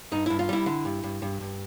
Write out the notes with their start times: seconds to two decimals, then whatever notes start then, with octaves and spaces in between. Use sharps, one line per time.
0.12 G2 D#4
0.26 G2 E4
0.39 F4
0.49 G3 E4
0.66 D3
0.85 G2
1.04 G2
1.22 G2
1.40 G2